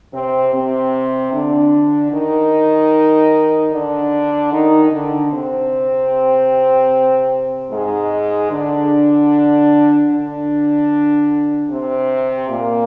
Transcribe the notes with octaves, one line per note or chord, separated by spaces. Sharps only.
C3 C4
C3 C4
D3 D4
D#3 D#4
D3 D4
D#3 D#4
D3 D4
C3 C4
G#2 G#3
D3 D4
D3 D4
C3 C4
A#2 A#3